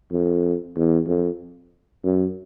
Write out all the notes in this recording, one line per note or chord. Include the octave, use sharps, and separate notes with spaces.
F2
E2
F2
F#2